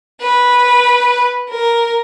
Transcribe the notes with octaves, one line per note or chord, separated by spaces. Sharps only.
B4
A#4